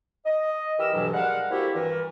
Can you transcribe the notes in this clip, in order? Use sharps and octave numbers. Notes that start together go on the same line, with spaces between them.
D#5
E3 G4 A#4 D#5 E6
D2 G2 B2 E3 F#3
G3 G#3 A#4 F5 F#5
A#3 C4 E4 F#4 G4 A4
G2 E3 A#4